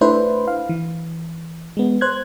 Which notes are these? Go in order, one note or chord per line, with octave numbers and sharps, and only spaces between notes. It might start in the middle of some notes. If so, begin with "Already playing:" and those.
A3 D4 E4 B4 C5
F5
E3
G#3 B3
C5 F#6 G#6